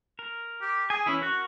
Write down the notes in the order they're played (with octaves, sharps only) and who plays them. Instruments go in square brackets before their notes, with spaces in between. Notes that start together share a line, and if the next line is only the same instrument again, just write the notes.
[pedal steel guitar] A#4
[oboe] G4
[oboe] G#4 [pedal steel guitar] G#5
[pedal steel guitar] E3 C#4 [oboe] E4
[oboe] F#4 [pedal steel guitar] A#4 F#5 C#6